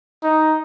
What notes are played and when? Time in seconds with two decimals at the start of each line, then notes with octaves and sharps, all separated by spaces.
0.23 D#4